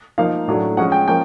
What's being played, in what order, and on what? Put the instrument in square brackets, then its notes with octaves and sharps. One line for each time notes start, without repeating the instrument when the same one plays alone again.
[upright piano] F3 A#3 D#4 F5
A2 F#3 A3 D4
F3 G#3 C#4 F#5
G5
F3 A#3 C#4 G5